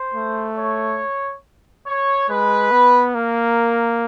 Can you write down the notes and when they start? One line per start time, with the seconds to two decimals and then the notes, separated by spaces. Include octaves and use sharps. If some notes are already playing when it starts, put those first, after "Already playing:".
Already playing: C5
0.14 A3
0.57 C#5
1.86 C#5
2.29 G#3 B4
2.71 B3
3.14 A#3 A#4